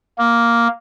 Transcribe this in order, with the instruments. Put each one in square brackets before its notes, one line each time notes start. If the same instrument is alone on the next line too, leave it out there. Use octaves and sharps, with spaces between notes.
[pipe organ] A#3